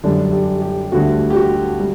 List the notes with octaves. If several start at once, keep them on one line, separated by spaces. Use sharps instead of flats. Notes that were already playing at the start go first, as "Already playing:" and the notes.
F#2 D3 G3 D4
G4
G4
D2 D3 G3 F#4
G4
F#4
G3